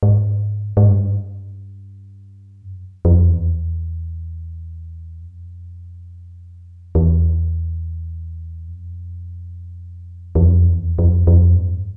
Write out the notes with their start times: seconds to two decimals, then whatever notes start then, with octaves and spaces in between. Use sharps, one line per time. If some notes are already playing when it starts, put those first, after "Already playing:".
0.03 G#2
0.77 G#2
0.89 G2
2.62 F#2
3.05 F2
3.27 E2
5.22 F2
6.95 E2
8.68 F2
10.35 E2
10.40 F2
10.69 E2
10.99 F2
11.27 F2
11.56 G2